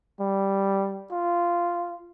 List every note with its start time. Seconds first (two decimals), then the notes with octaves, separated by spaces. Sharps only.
0.20 G3
1.12 F4